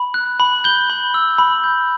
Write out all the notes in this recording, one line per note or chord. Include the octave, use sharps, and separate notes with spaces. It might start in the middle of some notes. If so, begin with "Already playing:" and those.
Already playing: B5
F#6
B5
G6 G7
B5
E6
B5
G6